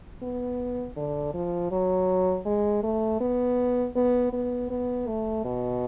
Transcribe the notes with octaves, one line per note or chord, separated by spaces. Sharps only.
B3
D3
F3
F#3
G#3
A3
B3
B3
B3
B3
A3
B2